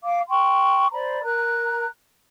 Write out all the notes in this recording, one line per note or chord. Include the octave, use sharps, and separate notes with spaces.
F5 D6
G5 C6 C#6
C5 D5 A#5 B5
A#4 A#5 F#6